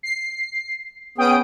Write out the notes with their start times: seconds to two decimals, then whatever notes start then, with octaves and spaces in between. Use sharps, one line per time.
0.03 C7
1.18 B3 C#4 G#4 G5 D#6 D7